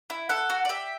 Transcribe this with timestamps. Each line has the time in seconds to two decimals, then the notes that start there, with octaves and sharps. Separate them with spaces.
0.10 E4
0.29 A4 F#5
0.50 F#4
0.65 D5
0.69 G4 E5